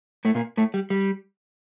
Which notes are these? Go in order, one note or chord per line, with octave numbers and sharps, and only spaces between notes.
A2 A3
A#2 A#3
A2 A3
G3
G3